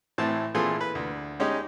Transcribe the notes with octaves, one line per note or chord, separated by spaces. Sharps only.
A2 E3 C4 E4 A5
A#2 E3 C4 F4 G#4 A4
B4
D2
G#3 C#4 D#4 G4